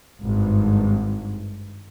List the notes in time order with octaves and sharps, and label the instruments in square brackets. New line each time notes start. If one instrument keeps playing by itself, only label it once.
[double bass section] G#1 G2